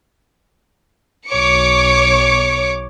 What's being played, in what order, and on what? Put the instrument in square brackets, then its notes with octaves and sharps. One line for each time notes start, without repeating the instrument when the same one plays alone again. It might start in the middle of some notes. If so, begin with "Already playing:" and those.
[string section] B1 C#5 D6 C#7